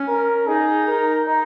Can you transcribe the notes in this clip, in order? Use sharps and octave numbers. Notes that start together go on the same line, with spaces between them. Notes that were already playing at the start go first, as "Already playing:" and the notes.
Already playing: C#4
A#4
D#4 G#4
A#4
D#4